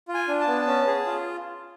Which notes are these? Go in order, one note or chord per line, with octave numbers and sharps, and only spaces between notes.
F4
G#5
D4
A5
B3
C#4
G#4
F4